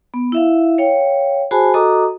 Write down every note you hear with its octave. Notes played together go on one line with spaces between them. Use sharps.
B3
E4 E5 F5
C#5 F5 G5
F#4 G#4 C5 G#5 A5 B5
F#4 A4 D#5 A#5 D6 D#6